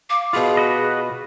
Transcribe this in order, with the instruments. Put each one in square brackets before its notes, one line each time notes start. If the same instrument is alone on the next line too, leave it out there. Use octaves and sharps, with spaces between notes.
[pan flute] F5 [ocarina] D6
[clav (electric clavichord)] B2 F4 [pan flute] G#4 [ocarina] B5
[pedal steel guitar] F#4 B4 D#5